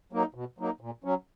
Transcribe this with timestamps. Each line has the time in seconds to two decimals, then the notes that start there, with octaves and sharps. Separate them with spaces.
0.12 F#3 A#3 D#4
0.34 B2
0.59 F#3 A#3 D#4
0.81 A#2
1.04 F#3 C#4